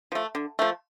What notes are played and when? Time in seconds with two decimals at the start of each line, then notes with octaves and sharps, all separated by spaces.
0.12 F3 A3
0.35 D3
0.59 F3 A3